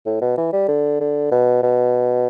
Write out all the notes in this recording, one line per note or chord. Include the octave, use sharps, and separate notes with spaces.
A2
B2
E3
G3
D3
D3
B2
B2